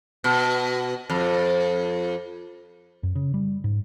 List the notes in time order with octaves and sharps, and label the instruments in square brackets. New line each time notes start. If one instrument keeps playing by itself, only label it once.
[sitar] B2
F2
[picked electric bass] F#2
C#3
G3
G#2